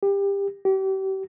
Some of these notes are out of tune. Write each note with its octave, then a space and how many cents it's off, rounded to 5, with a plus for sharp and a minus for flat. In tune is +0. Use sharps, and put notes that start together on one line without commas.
G4 +25
G4 -35